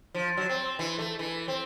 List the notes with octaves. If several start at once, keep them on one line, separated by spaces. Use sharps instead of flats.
F3
F#3
C4
E3
A3
E3
C4